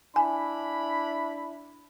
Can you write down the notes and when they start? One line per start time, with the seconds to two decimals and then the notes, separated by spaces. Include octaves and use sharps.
0.16 D4 E4 G#5 B5